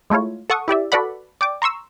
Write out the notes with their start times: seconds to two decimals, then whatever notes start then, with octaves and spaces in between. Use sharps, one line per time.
0.10 G#3 A3 E4 F4 C#5
0.50 A4 F#5 C#6 D#6
0.68 E4 G4 D5 E5
0.92 F#4 A4 B4 D5 F#5 B5
1.41 D5 G5 D6
1.62 A#5 C6 C#6 E6